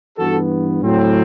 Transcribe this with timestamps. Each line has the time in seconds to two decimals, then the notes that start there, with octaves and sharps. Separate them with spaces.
0.18 G2 E3 B3 F#4 A4
0.83 A2 F#3 C4